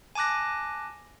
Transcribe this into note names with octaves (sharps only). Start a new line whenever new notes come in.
G#5 A5 D6 F#6 A#6